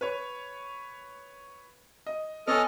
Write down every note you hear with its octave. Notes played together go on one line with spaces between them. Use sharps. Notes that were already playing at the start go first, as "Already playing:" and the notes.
B4 C#5 C#6
D#5
B3 A4 C#5 D#5 G#5 F6